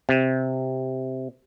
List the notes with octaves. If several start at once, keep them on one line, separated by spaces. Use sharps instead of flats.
C3